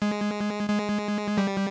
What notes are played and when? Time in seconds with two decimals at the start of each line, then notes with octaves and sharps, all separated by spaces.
0.02 G#3
0.69 G#3
1.38 G3